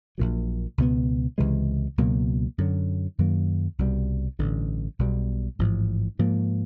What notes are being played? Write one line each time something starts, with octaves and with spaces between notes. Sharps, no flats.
A#1 A#2 F#3
C#2 B2 G#3 B3
C#2 C3 E3 G#3
C#2 B2 F#3 A#3
F#2 D3 F#3
F#2 D#3 F#3 A#3
C2 B2 G3
A1 G2 D3
B1 B2 G3
A1 G#2 F3
G#2 F3 A#3